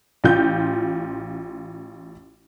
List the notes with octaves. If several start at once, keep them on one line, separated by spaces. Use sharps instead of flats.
A1 F4 G6